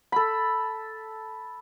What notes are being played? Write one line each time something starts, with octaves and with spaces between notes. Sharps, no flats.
A4 B5